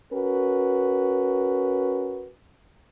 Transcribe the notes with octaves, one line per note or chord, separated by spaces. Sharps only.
C#4 F#4 A#4 B4